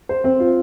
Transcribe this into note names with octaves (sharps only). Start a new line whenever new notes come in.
C5
C4
F4